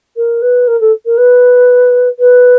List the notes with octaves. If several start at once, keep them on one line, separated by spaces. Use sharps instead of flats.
A#4
B4
A#4
A4
A#4
B4
B4